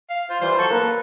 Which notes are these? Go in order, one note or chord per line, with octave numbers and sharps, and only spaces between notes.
F5
F4 C5
E3 G3 F4 C5
F#3 A4 C#6
A#3 B4